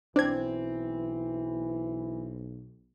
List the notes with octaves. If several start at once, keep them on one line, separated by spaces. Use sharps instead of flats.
B1 E3 C4 D4 G#6